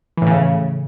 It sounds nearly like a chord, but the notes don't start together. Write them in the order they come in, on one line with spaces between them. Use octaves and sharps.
E3 A2 C#3